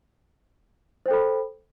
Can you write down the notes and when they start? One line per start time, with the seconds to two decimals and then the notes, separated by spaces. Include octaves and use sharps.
1.06 C5
1.08 G5
1.11 A4
1.13 B5